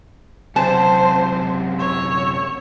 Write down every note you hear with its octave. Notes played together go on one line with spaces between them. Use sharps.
F#2 C3 C5 A5
C#5 E6